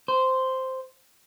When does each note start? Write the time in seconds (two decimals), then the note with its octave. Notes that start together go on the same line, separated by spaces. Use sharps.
0.08 C5